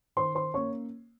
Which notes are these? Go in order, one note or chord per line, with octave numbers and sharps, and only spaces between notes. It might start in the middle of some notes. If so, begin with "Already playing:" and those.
D#3 C5 C6
C5 C6
A#3 C#4 C#5 C#6